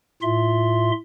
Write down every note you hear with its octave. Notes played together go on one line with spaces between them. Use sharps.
A2 F4 E5 C6